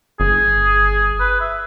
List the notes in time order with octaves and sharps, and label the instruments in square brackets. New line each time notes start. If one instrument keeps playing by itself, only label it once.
[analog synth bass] G1 [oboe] G#4
[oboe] B4
E5